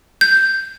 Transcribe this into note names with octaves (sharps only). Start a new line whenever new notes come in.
G6